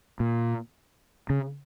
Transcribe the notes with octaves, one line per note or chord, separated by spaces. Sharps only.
A#2
C#3